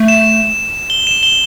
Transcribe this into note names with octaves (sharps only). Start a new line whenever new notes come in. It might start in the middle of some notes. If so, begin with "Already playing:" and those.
Already playing: A3
E7
G7
E7
G7